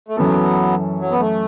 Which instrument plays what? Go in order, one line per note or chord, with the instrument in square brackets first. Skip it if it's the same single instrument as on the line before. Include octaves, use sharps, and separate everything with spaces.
[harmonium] A3
[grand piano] F#2 E3 C#4 A4 [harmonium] F#3 B3
[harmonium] F#3
B3
A3